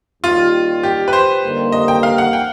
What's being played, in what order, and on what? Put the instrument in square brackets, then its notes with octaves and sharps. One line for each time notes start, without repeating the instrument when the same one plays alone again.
[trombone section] D#2 D#3 G3 [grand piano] F4
[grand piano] G4
B4
C5
[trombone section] G2 D3 G3 A#3 D#4
[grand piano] D#5
G5
F5
F#5
G5